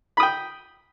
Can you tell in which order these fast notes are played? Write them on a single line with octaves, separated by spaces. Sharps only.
B5 D#6 G5